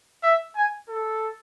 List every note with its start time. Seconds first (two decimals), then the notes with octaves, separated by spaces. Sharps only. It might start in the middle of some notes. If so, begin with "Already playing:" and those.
0.23 E5
0.56 G#5
0.88 A4